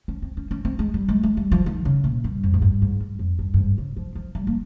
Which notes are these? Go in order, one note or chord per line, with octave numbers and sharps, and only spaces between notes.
C#4
C4
C#4
C#4
C4
G#3
G3
G#3
G#3
G3
F3
D#3
C#3
A#2
G2
F2
G#2
G2
G#2
G2
F2
G2
G2
G#2
C#3
F3
F3
G3
A#3